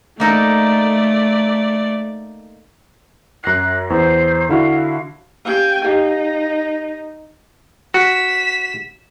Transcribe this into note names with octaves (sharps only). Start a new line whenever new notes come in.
A3 A#3 D#4 A4 D5
F#2 F#6 A#6 C7
E2 C5
D3 E4 F#4 F5
C#4 G4 F5 G5 G#5
D#4 G4 F5
F#4 B6 E7